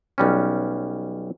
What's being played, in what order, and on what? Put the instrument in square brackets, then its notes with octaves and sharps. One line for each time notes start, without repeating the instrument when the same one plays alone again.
[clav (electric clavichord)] B1 G3 C#4